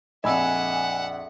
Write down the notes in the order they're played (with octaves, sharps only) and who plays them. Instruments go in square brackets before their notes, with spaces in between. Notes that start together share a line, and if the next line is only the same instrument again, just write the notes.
[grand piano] A#1 F2 [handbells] D#5 B5 E6 [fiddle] E5 F#5 [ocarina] G#5